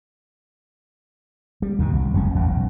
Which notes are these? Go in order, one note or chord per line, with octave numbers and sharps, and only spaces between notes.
G3
D#2 G#2 B2
C2
F#1 F#2 G#3 C#4
A1 E2
B1